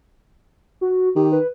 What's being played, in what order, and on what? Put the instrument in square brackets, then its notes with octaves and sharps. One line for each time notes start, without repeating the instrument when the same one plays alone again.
[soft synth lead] F#4
[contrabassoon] D#3 [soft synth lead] G4
[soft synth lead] B4